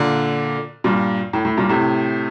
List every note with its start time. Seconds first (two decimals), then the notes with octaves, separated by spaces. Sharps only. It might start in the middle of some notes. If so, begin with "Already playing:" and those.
Already playing: A#2 D3
0.84 G2 A#2
1.33 A2
1.45 A2
1.57 G2 A#2
1.69 A2 C3